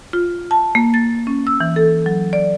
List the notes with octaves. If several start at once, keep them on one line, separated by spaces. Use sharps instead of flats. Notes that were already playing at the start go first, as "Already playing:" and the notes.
F4
A5
A#3
A6
C#4
E6
E3
A4
F#3
D5